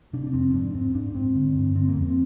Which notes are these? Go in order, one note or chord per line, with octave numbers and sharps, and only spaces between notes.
C3 D4
D4
F2 C4
G#2 D4
G#2 C4
G#2 D4
G#2 C4
D3
G2
D3 C4
A#3
F2
C4